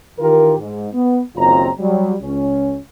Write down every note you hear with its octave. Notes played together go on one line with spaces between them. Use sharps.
D#3 E3 F4 G4 A#4
G#2
B3
F#1 B1 D#3 C4 F4 A#5
F#3 G3
C#2 C#4